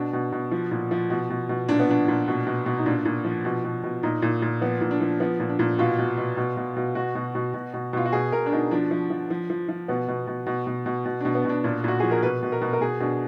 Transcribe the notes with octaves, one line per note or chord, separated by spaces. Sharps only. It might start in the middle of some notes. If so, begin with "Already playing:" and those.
Already playing: B2 D4
B2
B2
F3
A#2
F3
B2
B2
B2
A#2 D4
B3
F3 D4
A#2
B2
B2
B2
D#4
A#2 D4
A#2
F3
B2
B2
B2
A#2 D#4
A#2
A#2
F3 B3
A#2
D4
F3
F3 B3
A#2
D4
A#2
B2 F4
B2
B2
B2
B2
B2
B2 F#4
B2
B2
B2
B2
B2 F4
F#4
B2 G#4
B2 A#4
D4
B2 D#4
F3 D4
F3
F3
F3
F3
F3
B2 B3
B2
B2
B2
B2
B2
B2
B2 D4
B3
B2 D4
A#2 D4
A#2 F#4
F3 G#4
A#4
B2 B4
B2
A#4
B2
A#4
B2 G#4
B2 D4